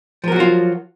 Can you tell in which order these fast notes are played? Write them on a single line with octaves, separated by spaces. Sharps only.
F3 A#4 F#3 F#4 F4